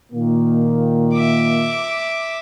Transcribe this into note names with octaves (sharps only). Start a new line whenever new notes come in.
A#2 D#3 A#3
E5 D6